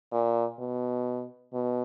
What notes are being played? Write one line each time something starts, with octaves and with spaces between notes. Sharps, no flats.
A#2
B2
B2